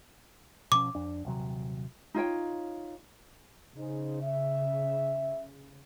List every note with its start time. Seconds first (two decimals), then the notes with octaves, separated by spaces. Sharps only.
0.72 B2 F3 C#4 D6
0.95 F2 D4
1.25 D#1 C3 F#3
2.14 D#4 F4 C#5 G5
3.77 C#3 D#4 G#4 C5
4.22 E5